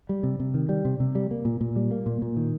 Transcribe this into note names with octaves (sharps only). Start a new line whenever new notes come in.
G3
C3
C3
D#3
G3
C3
C3
G3
A#3
A#2
A#2
G3
A#3
A#2
A#2
D#3